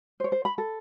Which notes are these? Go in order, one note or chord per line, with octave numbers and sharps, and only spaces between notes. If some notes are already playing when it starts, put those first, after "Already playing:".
C5 C#5
C5
B5
A4